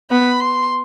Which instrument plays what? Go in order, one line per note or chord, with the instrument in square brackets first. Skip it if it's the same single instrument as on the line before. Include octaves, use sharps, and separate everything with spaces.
[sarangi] B3 [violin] B5
[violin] C6